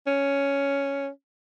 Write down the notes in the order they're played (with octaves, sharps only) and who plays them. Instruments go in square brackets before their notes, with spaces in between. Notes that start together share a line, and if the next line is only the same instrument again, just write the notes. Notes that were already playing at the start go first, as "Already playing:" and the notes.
[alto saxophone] C#4